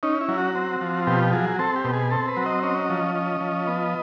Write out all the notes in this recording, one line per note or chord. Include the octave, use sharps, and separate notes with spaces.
C#4 D#4
E4
F#3
F#4
C4
F3
B2 G4
F#3 G#4
C4 A4
G4
B2
G#4
C4 A4
B4
F#3
D#5
C#4 D#5
F3
C#4
F3
B3